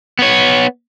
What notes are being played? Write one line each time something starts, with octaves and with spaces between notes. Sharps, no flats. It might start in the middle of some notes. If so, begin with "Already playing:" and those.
B3 C#5